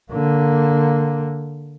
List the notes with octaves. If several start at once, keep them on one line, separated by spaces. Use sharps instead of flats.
D3 A#3